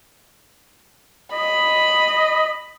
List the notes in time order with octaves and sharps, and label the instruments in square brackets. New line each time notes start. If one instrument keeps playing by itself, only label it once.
[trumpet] D#5 [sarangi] B5